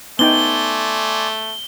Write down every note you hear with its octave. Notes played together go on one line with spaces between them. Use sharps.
A3 B3 D#4 D5 G5 G#5 C6 G7